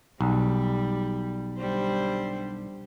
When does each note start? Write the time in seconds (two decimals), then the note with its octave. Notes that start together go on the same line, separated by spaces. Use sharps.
0.21 B1 G3
1.59 D3 G3 C5